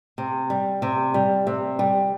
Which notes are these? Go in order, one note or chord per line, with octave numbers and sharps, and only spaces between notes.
C3
G3
C3
G3
C3
G3